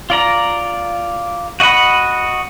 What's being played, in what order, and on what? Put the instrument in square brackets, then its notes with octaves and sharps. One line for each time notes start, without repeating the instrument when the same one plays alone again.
[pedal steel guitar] F4 D5 A#5
F#4 D#5 F#5 B5